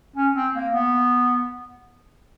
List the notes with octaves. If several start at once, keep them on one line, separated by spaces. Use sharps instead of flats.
C#4
C4
A#3
B3